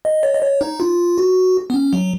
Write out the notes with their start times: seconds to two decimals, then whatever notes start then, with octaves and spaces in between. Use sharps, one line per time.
0.05 D#5
0.23 C#5
0.34 D#5
0.43 C#5
0.61 D#4
0.80 F4
1.18 F#4
1.70 B3
1.74 C#4
1.93 F#3